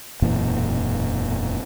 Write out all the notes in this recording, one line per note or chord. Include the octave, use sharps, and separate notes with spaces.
E1 F#2 A#2 E3